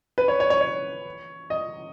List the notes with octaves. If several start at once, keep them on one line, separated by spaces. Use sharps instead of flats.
B4
C#5
C#5
C#5
C#5
D#5